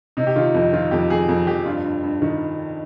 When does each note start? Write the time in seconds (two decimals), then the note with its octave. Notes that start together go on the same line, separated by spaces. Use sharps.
0.17 C3 D#4
0.27 G4
0.36 D#3 F4
0.54 F2 D#4
0.73 D#3 F4
0.91 F2 G4
1.10 F2 G#4
1.29 F2
1.47 F2 G4
1.66 G2 F4
1.84 G2
2.03 G2
2.22 D#3